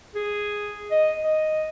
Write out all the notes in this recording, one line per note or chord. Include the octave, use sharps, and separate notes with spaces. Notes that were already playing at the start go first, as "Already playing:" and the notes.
G#4
D#5
D#5